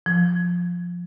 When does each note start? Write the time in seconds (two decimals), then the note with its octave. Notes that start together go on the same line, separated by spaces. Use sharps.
0.06 F3